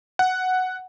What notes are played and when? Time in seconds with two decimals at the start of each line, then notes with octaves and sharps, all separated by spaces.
0.19 F#5